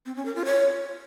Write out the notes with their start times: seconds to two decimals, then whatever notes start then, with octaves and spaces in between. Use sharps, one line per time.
0.06 C4
0.16 C#4
0.26 A#4
0.35 F4
0.45 C#5